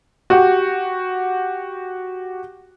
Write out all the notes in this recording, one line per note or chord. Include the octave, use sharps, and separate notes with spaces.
F#4 G4